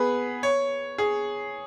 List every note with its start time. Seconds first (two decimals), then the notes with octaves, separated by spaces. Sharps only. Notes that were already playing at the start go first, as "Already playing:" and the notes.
Already playing: B3 G#4 B4
0.43 C#5
0.98 G#4